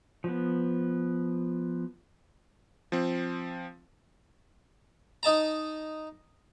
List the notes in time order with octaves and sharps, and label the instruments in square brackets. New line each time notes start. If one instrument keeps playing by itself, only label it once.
[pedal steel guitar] F3 B3
[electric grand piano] F3 C4
[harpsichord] D#4 D#5 A5 A#5